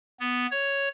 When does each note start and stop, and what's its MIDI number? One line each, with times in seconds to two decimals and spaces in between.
0.20 0.46 59
0.51 0.89 73